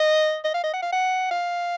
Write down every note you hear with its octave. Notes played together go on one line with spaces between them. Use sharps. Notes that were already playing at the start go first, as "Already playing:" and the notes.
Already playing: D#5
D#5
F5
D#5
F#5
F5
F#5
F5